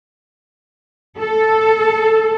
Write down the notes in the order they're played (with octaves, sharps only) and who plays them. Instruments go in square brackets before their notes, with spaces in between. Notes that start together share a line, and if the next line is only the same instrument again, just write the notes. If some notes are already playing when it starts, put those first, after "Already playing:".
[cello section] A4